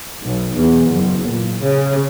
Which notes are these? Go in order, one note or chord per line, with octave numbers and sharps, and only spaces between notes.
B1
E2
F#1
A#2
C#3